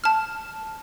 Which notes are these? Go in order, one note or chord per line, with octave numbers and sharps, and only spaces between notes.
A5 F6